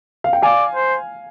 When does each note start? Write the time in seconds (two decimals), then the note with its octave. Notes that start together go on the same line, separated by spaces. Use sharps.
0.24 F5
0.33 G5
0.42 D5 F5 G#5
0.75 C5